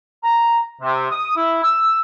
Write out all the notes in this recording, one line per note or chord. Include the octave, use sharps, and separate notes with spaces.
A#5
C3
D#6
E4
E6